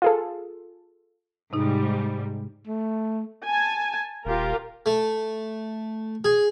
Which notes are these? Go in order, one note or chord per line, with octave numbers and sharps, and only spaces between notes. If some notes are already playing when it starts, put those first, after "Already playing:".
F4 G#4 A4
G#2 C3 G3 D#4
A3
G#5 A5
D#1 F4 G4 A#4
A3
G#4